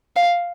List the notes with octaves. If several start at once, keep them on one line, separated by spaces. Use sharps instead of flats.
F5